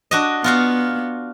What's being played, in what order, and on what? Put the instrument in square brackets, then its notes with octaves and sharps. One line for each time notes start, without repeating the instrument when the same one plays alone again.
[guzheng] D4 F#4 D#5
[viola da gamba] B3 [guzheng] F4 F#4 F5